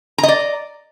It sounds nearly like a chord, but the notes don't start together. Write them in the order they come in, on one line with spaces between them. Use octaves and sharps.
A#5 D#5 D5